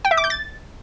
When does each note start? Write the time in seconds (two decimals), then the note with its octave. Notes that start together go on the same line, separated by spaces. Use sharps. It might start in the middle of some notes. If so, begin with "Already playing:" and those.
0.05 G5
0.11 E5
0.17 D6
0.24 G6
0.30 A6